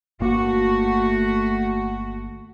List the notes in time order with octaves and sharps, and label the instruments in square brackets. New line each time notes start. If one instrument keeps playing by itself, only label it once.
[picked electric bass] G1 A#3 [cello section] A3 F#4